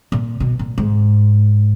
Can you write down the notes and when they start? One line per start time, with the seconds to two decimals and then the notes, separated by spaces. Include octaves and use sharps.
0.12 A#2
0.40 B2
0.59 A#2
0.78 G#2